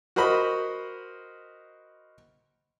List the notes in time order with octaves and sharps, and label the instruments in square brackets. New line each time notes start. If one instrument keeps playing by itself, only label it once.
[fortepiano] F#4 A#4 C5 D#5 B5